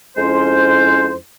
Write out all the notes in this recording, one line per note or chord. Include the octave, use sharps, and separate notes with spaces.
F2 G#3 C#4 E4 C5